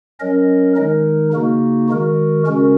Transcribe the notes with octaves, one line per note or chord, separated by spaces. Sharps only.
F#3 C#4 A#4 D#5
D#3 G#3 D#4 A#4
C#3 A#3 D#4 F#4
D#3 G#3 F#4 A#4
C#3 G#3 C#4 F#4 A#4